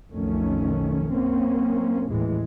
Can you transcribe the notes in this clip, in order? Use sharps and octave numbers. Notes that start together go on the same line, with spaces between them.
B1 F2 D#3 A3 C#4
F#2 A#3 C4 C#4
A1 D#2 A2 E3 G#3